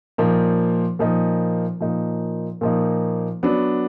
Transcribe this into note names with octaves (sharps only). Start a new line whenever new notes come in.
A#2 F3 A#3 D#4
A#2 F3 A#3 D#4
A#2 F3 A#3 D#4
A#2 F3 A#3 D#4
F#3 B3 D4